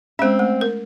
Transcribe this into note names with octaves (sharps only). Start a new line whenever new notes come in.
G#3 C4 C#4 E5
A3
A#4